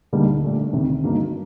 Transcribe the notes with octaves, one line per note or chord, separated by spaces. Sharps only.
D2 D3 G3 A#3 D#4
A#2 A3 D4
D2 C3 D#3
G2 F#3 A#3 D#4